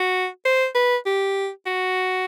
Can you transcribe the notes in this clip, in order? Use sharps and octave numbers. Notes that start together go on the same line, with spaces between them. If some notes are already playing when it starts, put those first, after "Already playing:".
Already playing: F#4
C5
B4
G4
F#4